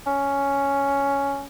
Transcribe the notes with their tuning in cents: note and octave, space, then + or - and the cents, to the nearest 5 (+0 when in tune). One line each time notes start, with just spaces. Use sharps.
C#4 +5